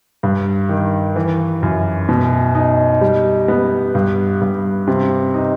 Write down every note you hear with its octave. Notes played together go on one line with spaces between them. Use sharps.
G2
D#3
E3
F#2
B2
D#4
G3
B3
G2
G2
C3
D#4